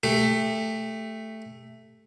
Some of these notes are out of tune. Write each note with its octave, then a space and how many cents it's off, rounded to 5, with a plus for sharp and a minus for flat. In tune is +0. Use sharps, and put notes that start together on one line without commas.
A3 +0 G4 +25